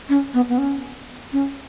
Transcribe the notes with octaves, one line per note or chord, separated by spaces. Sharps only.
C#4
B3
B3
C#4
C#4